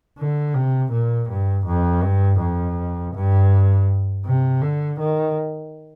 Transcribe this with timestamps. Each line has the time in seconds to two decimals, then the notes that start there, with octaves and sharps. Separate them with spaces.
0.18 D3
0.54 C3
0.92 A#2
1.30 G2
1.66 F2
2.03 G2
2.40 F2
3.14 G2
4.25 C3
4.62 D3
5.00 D#3